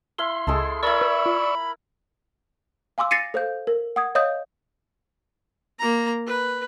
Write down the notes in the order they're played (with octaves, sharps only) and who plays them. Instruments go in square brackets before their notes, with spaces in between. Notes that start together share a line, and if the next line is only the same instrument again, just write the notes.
[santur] E4 F5 B5 [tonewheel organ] C6
[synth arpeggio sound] C#2 G#4 [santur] G#3 A4 A5
[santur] E4 A#4 [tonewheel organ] D5 C#6 E6 [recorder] B5
[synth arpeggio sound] B4
F4
[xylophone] F5 G#5 C6 D6 E6
A6 A#6 C7 C#7 D#7
A4 C5 F5 G6
A#4
F#5 D#6 G#6
C#5 D#5 F5 D#6 G6
[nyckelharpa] A#3 A#5
B4